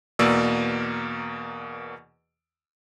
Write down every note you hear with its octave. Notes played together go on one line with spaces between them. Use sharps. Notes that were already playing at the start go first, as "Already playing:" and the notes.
E2 B2 A#3 D5 E6